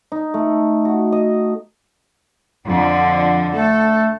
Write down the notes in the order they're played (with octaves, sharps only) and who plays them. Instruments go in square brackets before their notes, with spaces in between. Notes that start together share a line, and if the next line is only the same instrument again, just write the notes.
[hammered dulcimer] D#4
A3
F#4
D#5
[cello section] F2 D3 F3
[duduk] A3 [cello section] A4